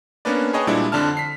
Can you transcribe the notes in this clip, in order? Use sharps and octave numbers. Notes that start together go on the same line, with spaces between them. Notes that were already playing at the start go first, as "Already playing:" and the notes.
A#3 B3 C#4 D4 B4 D5
G#4 B4 C#5 D#5 G5 A5
A#2 G3 G#3 D4 E4
F2 D3 D4 A5 F6
B6 C7